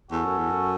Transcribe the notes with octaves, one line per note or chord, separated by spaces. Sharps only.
E2 C#4 F#4 A4
F#2
E2
F#2